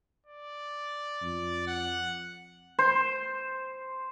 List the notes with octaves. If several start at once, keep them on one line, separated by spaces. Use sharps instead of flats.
D5
F2
F#5
C5